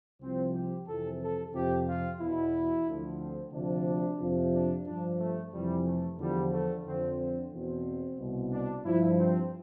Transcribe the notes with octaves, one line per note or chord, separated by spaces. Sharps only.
C2 C3 F3 C4
G4
F2 C3 E3 A4
A4
F2 C3 F3 G4
F4
E2 B2 E4
D2 D3 F3
C4
D2 C3 F3 D4
F2 C3 F3
D4
G2 F3 D4
A3
F2 C3 E3 G3
A3
E2 D3 F3 G3
A3
F2 D3 F3 C4
C4
E2 B2 C4
C2 B2
D4
G2 F3 E4
C4